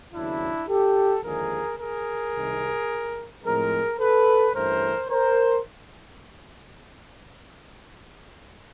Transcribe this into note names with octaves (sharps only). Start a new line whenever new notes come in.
D#2 C#3 F#3 B3 D4 E4
G4 A4
D#2 D3 F3 G#3 G#4 A#4
G#4 A#4
C2 C3 D#3
A2 F3 G#3 C4 G#4 A#4
A4 B4
G2 E3 A3 C#4 A#4 C5
A#4 C5